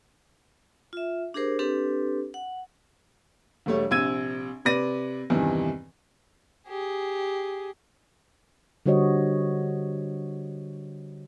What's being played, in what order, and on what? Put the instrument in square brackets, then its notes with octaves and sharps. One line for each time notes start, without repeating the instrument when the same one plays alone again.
[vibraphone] F4 E5
D4 G4 G#4 A#4 C5
C4 D4 G4 A4 B4
F#5
[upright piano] E1 G3 A3 C#5
A#1 C3 E6 G#6 D#7
C3 B4 D5 A#6 D#7
E2 G2 C3 D#3 E3
[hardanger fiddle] G4 G#4
[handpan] D3 G3 F#4 C5 C#5 D#5